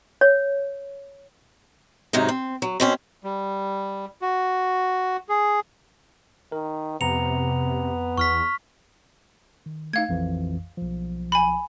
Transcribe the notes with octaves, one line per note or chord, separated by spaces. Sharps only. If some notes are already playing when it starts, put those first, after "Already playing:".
C#5
G#2 C3 F#3 D#4
C4
F#3
B2 C4 C#4
G3
F#4
G#4
D#3 A#4
F2 C3 B3 A#5 C#7 F7
E2 C#6 F6 B6
D#3
A3 D#4 F5 G#6
A#1 F2 E3
B1 F3
G#5 B5